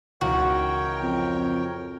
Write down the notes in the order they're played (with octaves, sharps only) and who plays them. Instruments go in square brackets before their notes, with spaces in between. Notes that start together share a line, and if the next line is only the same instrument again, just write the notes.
[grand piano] C#2 E3 [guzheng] F#4 [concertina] A#4 C#5 G5
[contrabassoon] F2